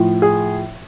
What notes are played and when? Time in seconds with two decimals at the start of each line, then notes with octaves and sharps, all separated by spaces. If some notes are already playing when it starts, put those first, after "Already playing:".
Already playing: A2 F3
0.22 G#4